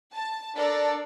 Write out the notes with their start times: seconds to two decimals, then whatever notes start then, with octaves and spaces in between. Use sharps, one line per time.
0.12 A5
0.55 D4 A4 A#4 D5